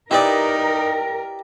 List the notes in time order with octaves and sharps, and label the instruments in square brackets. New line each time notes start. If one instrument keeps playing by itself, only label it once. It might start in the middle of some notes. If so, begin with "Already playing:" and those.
[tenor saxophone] D#4 [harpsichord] E4 B4 D5 [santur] G4 D#5 [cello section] A#4